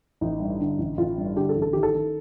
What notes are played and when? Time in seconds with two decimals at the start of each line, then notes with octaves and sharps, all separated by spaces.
0.21 A1 D#4
0.40 G2
0.60 D3
0.78 A1
0.98 A1 F4
1.18 G2
1.36 D3 G4
1.49 A4
1.55 A1
1.62 A4
1.73 D#3 G4
1.83 A4
1.95 D#3